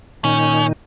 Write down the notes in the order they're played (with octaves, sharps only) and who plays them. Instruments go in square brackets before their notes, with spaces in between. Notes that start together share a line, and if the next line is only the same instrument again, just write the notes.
[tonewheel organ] A#2 D#3 D#4 [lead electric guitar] C#4